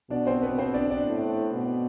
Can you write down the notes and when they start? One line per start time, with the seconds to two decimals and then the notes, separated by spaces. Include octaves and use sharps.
0.10 B2 D4 D5
0.27 C4 C5
0.42 B3 B4
0.58 C4 C5
0.74 D4 D5
0.91 D4 D5
1.06 A2
1.54 B2